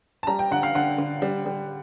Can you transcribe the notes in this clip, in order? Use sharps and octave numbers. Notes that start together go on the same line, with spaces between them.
A5
G3 A#5
G5
D3 F#5
F5
D3 F#5
D3
G3
G3